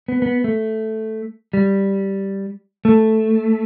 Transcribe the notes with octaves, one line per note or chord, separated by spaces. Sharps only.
B3
B3
A3
G3
A3